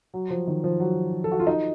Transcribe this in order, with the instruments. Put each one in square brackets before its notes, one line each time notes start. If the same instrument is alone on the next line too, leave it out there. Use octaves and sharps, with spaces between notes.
[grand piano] F#3
F3
D#3
F3
F#3
A4
F#4
F4
D#4